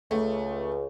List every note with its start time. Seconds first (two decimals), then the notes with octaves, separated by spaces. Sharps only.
0.11 C#2 A3